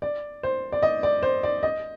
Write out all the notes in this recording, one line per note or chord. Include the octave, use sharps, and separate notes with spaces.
D5
C5
D5
D#5
D5
C5
D5
D#5